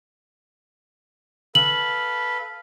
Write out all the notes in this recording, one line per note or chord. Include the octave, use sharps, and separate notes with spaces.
A4 B4 F5 F#7